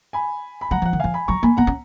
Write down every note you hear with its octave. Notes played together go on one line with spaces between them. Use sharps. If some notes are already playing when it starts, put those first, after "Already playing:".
G#5 B5
B5
F#3 F#5 A#5
F3 F#5
D#3
F3 F5 G#5
G#5 B5
F#3 A#5 C#6
A#3 G#5 B5
B3 F#5 A#5
C#4